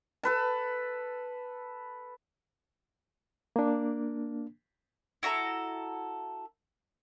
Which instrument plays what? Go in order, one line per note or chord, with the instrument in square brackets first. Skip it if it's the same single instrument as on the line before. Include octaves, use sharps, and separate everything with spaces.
[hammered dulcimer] A4 B4 A5
[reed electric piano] A#3 D4
[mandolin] E4 F#4 A4 A#5